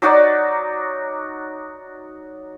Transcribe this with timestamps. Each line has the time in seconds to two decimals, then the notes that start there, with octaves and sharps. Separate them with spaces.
0.02 F#3 D#4 F#4 D5